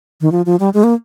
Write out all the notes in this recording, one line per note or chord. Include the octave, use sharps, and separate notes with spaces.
D#3
F3
F3
G3
G#3
A#3